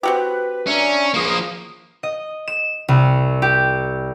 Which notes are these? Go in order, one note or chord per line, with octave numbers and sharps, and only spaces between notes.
C4 F#4 G4 B4
C#4 D4 E5 A#5
C#2 F3 A#3 D#6
D#5
E7
C2
G4